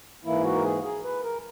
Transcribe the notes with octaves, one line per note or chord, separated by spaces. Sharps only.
G#2 E3 A#3 E4
F#4
A#4
G#4
G#4
B4
A#4